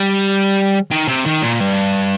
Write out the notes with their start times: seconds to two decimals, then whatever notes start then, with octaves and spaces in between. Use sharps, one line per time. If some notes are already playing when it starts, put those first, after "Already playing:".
Already playing: G3
0.91 D#3
1.08 C3
1.25 D#3
1.42 A#2
1.60 G2